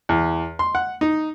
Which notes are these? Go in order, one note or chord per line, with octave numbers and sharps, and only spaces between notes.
E2
C6
F#5
D#4